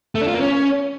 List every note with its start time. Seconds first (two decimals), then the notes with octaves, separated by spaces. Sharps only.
0.15 A3
0.21 D4
0.28 F4
0.34 A#3
0.40 C#4